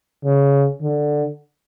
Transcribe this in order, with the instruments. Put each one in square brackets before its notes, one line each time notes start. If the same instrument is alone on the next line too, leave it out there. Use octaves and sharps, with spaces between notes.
[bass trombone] C#3
D3